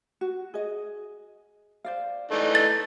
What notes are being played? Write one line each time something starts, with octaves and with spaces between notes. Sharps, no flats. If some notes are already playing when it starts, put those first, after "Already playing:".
F#4
G#4 D#5
C5 D5 F5
E3 A3 D#4 C#5 D5
A6